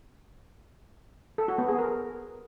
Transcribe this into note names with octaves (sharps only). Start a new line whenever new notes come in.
A4
F#4
B3
G#4
A#4